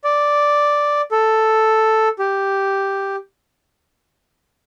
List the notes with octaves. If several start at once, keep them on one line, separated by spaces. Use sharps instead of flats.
D5
A4
G4